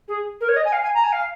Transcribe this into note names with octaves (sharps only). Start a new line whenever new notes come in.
G#4
A#4
C#5
D#5
G#5
F5
G#5
A#5
G#5
F5